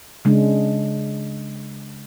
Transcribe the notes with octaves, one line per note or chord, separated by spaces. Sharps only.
C#3 G#3 D4